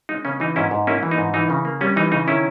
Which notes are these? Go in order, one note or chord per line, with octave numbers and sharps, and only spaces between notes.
G#3 D#4
C#3 C#4
E3 D#4
G#2 C#4 E4
G#2
A#3 C#4 E4
E3
D#4
G#2
E3 D#4
C#3
A#3
G3 C#4
E3 D#4
C#3 D#4
D#3 C#4 E4